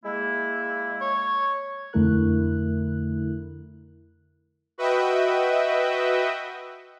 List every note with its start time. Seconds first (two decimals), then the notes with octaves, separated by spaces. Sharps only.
0.04 G#3 A#3 E4
1.01 C#5
1.93 F2 D3 A3 E4 A#4 F#6
4.78 F#4 B4 D#5 E5 G5